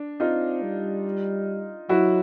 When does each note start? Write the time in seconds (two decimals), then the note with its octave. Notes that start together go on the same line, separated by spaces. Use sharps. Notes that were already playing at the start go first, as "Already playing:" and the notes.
Already playing: D4
0.20 C4 D#4 F4
0.62 G3
1.89 F#3 E4 F#4